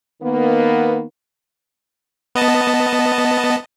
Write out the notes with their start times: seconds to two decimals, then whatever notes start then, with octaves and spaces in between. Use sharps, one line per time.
0.22 D#3 A#3 B3
2.35 B3 D#5 A5